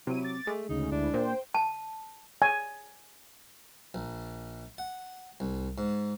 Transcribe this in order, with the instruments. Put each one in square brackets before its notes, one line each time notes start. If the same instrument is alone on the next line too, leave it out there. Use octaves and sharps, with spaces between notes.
[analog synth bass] C3 [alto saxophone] F#3 [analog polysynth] E4 D#7
[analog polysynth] D6 A6
[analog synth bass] G#3 [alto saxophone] A3
[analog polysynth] D2 C#3 [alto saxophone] D#4
[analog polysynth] D2 E4 [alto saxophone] D4
[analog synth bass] A#2 [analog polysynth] C5 G5
[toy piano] A5
[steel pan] G#5
[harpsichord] A#1
F#5
C2
G#2